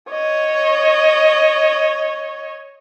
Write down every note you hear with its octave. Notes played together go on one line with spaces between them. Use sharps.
C#5 D#5